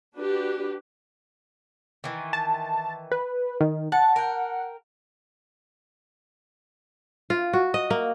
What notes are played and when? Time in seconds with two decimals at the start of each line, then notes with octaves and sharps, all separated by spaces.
0.16 D4 F#4 G4 B4
2.04 D#3 E3
2.33 A5
3.12 B4
3.61 D#3
3.92 F#5 A5
4.16 A#4 G5
7.30 F4
7.53 F#4
7.74 D#5
7.90 A#3